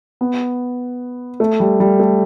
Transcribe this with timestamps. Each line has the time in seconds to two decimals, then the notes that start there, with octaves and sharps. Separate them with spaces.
0.21 B3
1.40 A3
1.60 G3
1.80 G3
2.00 A3